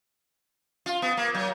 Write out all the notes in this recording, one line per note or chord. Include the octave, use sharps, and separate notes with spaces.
F4
B3
A#3
F#3